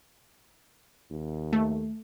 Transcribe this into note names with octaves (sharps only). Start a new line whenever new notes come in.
D#2
A3